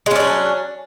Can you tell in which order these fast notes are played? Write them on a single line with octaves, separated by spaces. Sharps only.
G#3 C#4 D4 F#3